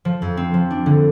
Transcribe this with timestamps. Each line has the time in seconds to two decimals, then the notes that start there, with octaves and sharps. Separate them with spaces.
0.05 F3
0.22 F2
0.37 C4
0.54 F3
0.71 D4
0.86 D3